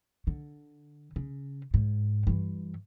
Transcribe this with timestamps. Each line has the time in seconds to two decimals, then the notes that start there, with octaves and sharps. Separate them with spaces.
0.27 D3
1.16 C#3
1.74 G#2
2.27 G2 E3